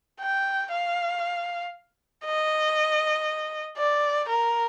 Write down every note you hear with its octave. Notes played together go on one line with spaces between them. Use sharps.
G5
F5
D#5
D5
A#4